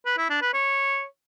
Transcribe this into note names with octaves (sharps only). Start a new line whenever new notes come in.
B4
E4
D4
B4
C#5